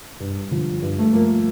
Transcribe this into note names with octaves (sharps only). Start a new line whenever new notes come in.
G2
D3 F3
G2
A3
F3 A#3